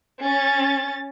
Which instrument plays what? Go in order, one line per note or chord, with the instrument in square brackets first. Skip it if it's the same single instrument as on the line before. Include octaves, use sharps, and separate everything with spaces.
[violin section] C#4 A6